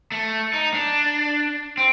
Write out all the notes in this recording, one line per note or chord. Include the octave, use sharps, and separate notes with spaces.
A3
D#4
D4
C4